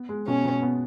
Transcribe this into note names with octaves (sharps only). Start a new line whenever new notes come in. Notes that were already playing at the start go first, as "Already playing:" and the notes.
Already playing: B3
G#3
B2 C#4
B2
B3